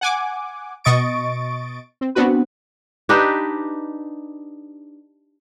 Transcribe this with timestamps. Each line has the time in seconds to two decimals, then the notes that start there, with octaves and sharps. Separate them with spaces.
0.01 F#5 G#5 D6
0.84 B2 D#5 C#6 A6 D7
2.01 C4
2.15 B3 C4 D4 F#4 B4
3.09 D4 D#4 G4 B4